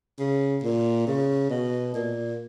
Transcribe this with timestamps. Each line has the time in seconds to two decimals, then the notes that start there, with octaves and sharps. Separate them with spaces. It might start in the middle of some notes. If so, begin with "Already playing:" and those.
0.19 C#3
0.63 A#2
1.07 C#3
1.50 B2
1.94 A#2